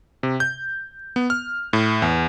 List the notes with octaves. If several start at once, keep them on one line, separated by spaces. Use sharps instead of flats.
C3
G6
B3
F6
A2
E2